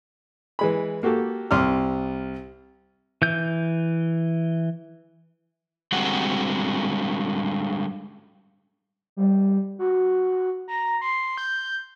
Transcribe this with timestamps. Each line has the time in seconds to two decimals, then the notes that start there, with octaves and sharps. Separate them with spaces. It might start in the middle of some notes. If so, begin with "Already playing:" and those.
0.59 E3 G#3 B5
1.03 A#3 F#4 G4 A4
1.51 C2 C6 D6 F6
3.22 E3 G6
5.92 D3 G3 G#3 C4 F#4 F#5
9.17 G3
9.79 F#4
10.68 A#5
11.01 C6
11.37 G6